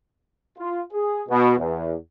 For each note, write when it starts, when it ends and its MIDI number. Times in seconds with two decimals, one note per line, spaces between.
0.59 0.82 65
0.93 1.23 68
1.29 1.54 47
1.59 1.95 40